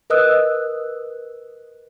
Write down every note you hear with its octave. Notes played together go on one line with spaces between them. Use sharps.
A#4 B4 D#5 D#6 E6 F#6